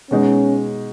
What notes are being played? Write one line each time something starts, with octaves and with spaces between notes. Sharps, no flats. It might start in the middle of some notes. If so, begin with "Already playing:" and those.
B2 G#3 C#4 D#4